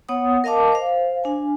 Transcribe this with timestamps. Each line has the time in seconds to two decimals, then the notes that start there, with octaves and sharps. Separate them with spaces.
0.09 B3 C#5 F#5 D#6
0.44 A#4 D#5 F5 A5 D6
0.72 C5 F5
1.24 D4 G#5